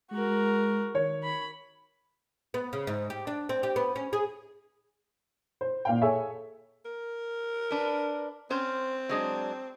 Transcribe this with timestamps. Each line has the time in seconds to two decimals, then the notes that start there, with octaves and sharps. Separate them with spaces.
0.12 G#3 F#4 A#4
0.95 D#3 C#5
1.23 B5
2.54 B3
2.73 C#3
2.87 G#2
3.10 G4
3.27 D4
3.49 C4
3.63 G4
3.76 B3
3.96 C#4
4.13 G#4
5.61 C5
5.85 A#2 F5 G5
6.01 G#4 A4 C#5 E5 G#5
6.85 A#4
7.71 D4 B4
8.50 C4 C#4 C5
9.09 F#3 G#3 D4